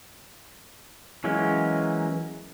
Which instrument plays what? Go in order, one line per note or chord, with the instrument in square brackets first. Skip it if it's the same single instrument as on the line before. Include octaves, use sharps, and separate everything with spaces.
[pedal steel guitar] E3 F#3 G#3 A#3 C#4